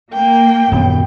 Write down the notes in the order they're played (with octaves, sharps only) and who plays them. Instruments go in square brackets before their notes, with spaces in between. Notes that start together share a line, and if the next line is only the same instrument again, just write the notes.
[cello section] A#3 [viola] G5
[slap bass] D#1 B3 [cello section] F#2